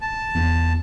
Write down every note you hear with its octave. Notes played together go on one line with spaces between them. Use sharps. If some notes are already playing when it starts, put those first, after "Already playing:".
A5
E2